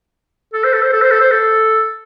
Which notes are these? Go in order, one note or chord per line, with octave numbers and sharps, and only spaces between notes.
A4
C5
A4
C5
A4
C5
A4
C5
A4